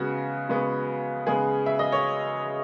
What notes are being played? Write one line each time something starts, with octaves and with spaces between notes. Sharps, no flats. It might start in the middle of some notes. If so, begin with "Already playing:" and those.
Already playing: C#3 G#3 B3 F#4
C#3 G#3 B3
C#3 G#3 B3 G#4
E5
D#5
C#5